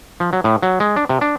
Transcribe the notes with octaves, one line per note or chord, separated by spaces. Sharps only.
F3
F#3
A2
F#3
G#3
D4
C3
D4